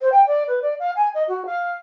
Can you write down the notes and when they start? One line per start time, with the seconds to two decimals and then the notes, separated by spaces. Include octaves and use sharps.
0.01 C5
0.12 G5
0.27 D5
0.47 B4
0.62 D5
0.80 F5
0.96 G#5
1.14 D#5
1.28 F#4
1.46 F5